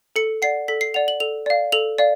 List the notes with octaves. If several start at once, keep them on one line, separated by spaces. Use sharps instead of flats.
A4 C#7
D5 F#5 C7
A4 B6
C7
D5 F#5 F7
F#7
A4 F7
D5 F5
A4 F7
D5 F5